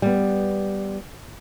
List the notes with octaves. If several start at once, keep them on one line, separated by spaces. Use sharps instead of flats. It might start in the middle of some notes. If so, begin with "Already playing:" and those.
G3 B3